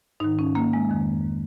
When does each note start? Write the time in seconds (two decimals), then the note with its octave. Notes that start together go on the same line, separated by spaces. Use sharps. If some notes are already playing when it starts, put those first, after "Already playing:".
0.20 G#2 D#3 D#4
0.39 C#4
0.55 A#3
0.73 G#3
0.90 F2 D#3